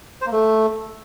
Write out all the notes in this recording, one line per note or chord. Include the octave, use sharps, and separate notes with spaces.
C5
A#3
A3